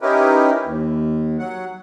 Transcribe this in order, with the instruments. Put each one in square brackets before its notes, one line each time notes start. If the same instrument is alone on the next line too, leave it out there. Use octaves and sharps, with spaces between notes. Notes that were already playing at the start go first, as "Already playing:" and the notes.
[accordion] C#4 D#4 E4 G4 A#4 B4
D#2
F#3 F#5